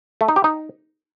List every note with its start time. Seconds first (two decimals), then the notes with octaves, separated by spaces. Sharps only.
0.21 A3
0.28 D#4
0.36 G4
0.44 D#4